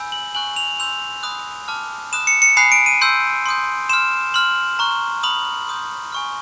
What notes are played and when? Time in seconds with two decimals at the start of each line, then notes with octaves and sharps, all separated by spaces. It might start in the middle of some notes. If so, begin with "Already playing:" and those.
Already playing: G#5 B5 E6 G6
0.12 F#7
0.35 G#5 C#6 F#6 F#7
0.56 F7
0.80 C6 E6 G6 F7
1.23 B5 D#6 F#6
1.68 A5 D6 F6
2.12 B5 D#6 F#6 E7
2.27 C#7
2.42 C#7
2.57 G#5 B5 D#6 F#6 C7
2.72 D7
2.86 D#7
3.01 C6 E6 G6
3.46 C6 D#6 G6
3.89 C6 F6 E7
4.34 C6 F6 F#7
4.79 A#5 C#6 F#6
5.23 B5 D#6 F#6 F#7
5.67 C6 D#6 G6
6.12 G#5 C#6 F6